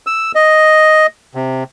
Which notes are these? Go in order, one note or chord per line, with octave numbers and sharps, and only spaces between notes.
E6
D#5
C3